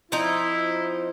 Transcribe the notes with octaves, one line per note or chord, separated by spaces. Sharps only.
F3 C4 D#4 E4